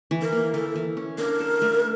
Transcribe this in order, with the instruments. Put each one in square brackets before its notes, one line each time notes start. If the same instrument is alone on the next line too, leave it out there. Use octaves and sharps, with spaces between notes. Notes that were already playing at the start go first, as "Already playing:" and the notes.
[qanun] E3
[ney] A#4
[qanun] A#3
[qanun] E3 [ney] A4
[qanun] E3
C#4
[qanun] D4 [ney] A#4
[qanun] A4
A3